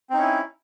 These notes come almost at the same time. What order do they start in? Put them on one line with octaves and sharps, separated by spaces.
C4 D#4 C#4 E4